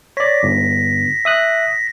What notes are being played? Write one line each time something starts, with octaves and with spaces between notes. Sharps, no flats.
C#5 D5 A#6 B6
G1
E5 D#6 F#6